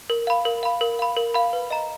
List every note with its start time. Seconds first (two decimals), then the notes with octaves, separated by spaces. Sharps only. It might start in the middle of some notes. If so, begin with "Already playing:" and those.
0.10 A#4
0.27 F5 B5
0.45 A#4
0.63 F5 B5
0.81 A#4
0.99 F5 B5
1.17 A#4
1.34 F5 B5
1.53 B4
1.70 D#5 A#5